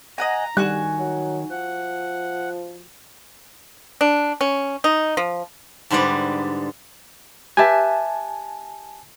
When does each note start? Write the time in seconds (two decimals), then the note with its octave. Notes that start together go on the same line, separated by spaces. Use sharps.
0.18 D#5 F#5 G#5 A#5
0.57 D#3 G3 F#4 G#5 F#6
0.99 F#3
1.51 F3 F#5
4.01 D4
4.41 C#4
4.84 D#4
5.17 F3
5.90 G#2 D3 G3 B4 D5
7.57 G4 B4 E5 G#5 A5